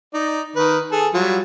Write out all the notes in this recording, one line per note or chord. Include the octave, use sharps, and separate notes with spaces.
D#4 D5
D#3 B4
G#4 A4
F#3 G3 F4